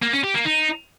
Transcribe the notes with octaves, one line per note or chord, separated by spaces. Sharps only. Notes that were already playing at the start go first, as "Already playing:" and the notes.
A#3
C#4
G4
A#3
D#4